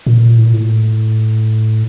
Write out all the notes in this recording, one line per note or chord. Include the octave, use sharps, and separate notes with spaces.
A#2
A2
A#2
A2